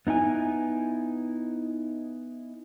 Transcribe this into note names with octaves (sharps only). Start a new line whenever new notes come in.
B3 D#4 E4 G#5